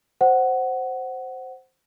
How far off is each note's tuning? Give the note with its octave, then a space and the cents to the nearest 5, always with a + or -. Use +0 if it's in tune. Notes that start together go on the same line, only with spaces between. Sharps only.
C5 +0 F#5 +10